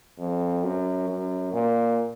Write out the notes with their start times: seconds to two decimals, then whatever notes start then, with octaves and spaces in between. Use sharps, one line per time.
0.19 F2
0.63 F#2
1.09 F#2
1.53 A#2